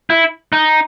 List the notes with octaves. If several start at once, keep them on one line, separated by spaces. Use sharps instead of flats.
E4
D#4